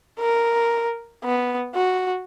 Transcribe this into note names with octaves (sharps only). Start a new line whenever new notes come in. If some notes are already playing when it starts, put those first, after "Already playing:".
A#4
B3
F#4